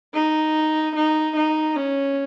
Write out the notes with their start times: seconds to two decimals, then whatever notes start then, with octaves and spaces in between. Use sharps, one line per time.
0.14 D#4
0.96 D#4
1.36 D#4
1.76 C#4